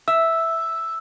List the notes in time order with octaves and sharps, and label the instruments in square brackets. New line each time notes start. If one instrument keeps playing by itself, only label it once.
[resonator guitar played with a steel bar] E5 [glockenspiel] E6